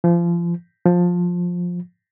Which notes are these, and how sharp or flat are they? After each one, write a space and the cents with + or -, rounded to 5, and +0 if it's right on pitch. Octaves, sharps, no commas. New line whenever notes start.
F3 -30
F3 +15